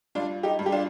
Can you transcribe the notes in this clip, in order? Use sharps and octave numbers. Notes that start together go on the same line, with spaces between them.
G2 D4 F4
D#4 G4
G2
G4
D4 F4